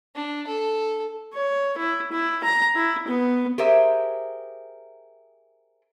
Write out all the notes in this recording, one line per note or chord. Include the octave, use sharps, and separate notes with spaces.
D4
A4
C#5
E4
E4
A#5
E4
B3
G4 G#4 A#4 C5 E5